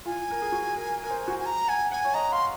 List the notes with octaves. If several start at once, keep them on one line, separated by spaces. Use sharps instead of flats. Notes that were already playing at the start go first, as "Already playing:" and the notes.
F4 G#5
A#4
G#4
F#4
A#4
A#4
C5
F#4
G#5
A#5
F#5 G#5
F#5 G#5
C#5
D#5 A#5
F5 C6